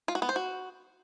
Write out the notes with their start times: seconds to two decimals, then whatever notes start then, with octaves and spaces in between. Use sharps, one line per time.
0.08 F4
0.15 F#4
0.22 B3
0.29 C5
0.36 F#4